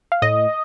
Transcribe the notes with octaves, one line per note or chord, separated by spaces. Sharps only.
F5
A2 D#5